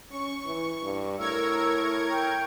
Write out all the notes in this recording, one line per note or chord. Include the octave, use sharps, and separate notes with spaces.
C#4 C#6
E3
G2
A2 A#4 C#6 E6 G#6
G5